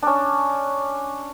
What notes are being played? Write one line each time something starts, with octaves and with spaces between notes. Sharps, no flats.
C#4 D4